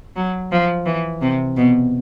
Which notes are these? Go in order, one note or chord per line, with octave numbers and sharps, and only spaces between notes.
F#3
F3
E3
C3
B2